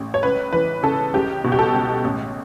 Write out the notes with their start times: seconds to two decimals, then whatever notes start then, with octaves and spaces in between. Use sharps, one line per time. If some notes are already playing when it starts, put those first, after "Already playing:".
Already playing: A1
0.14 C#5
0.23 C#2 B4
0.53 E3 B4
0.83 C#3 A4
1.13 C#2 G4
1.44 B2
1.52 G4
1.59 A4
1.74 C#2
2.04 A1